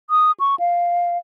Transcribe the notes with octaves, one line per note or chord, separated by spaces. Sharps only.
D#6
C#6
F5